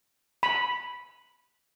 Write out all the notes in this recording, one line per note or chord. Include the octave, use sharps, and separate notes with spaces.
B5